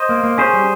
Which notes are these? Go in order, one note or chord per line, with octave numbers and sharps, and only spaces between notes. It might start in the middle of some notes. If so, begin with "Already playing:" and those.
Already playing: C5 D#5
A#3
A#3
C#4 G#4 C5
G3